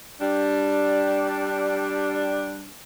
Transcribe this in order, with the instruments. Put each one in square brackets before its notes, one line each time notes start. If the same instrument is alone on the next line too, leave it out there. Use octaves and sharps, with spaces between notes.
[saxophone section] G3 D4